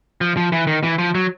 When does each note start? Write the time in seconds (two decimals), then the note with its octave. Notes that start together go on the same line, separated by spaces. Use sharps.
0.21 F3
0.37 F3
0.52 E3
0.67 D#3
0.83 E3
0.98 F3
1.15 F#3